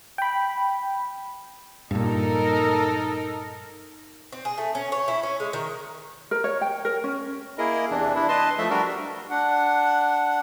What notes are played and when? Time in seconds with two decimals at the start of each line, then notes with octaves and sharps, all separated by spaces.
0.18 G5 B5
1.91 G2 A#2 D#4 A4 A#4
4.32 C4
4.45 G#4
4.58 A3
4.75 C#4
4.92 C#5
5.08 E4
5.23 C#4
5.40 G#3
5.53 D#3
6.31 A#4
6.44 C#5
6.61 G5
6.85 A#4
7.04 C#4
7.58 A#3 E4 G#4 A#4 D#5
7.90 E2 C3 E3 D4
8.15 D4 E4
8.29 B4 D#5 A5 C6
8.58 F3 A3 E5
8.70 G3 D4 F#4 A#4
9.30 D4 F#5